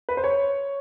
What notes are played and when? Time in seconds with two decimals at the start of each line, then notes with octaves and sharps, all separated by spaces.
0.09 B4
0.17 C5
0.24 C#5